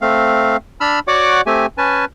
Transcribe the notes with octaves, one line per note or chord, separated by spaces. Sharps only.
A3 C4 F5
D4 B5 E6 F6
F#4 C#5 D5 F#5 D6
A3 C4 G4 G#5
C#4 B4 G#5 A5